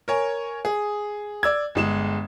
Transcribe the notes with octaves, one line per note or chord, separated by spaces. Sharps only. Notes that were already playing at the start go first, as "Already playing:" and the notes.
A#4 C#5 G#5
G#4
D5 E6 G#6
G1 G#3 E7